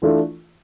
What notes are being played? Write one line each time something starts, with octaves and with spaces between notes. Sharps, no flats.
E3 A3 D4 F4